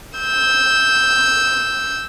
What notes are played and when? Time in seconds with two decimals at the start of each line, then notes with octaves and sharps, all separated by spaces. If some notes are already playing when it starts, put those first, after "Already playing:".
0.19 E6 G6